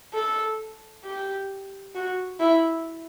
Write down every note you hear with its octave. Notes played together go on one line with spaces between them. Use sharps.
A4
G4
F#4
E4